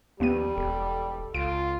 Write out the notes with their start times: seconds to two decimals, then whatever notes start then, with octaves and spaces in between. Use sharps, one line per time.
0.20 D#2 F3 G3 B3 G4 D#7
0.57 E1 A4
1.34 C#2 F4 D7